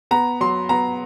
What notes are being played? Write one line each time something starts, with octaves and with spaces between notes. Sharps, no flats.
B3 A#5
F#3 C6
B3 A#5